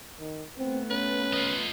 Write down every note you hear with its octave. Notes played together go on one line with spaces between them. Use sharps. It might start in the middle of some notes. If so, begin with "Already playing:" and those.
D#3
A3 B3 C4
C#4 B4
F4 D#5